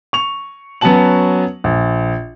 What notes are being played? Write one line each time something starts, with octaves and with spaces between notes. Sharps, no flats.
C#6 F7
F#3 B3 C#4 F#4 A5 F#7
A#1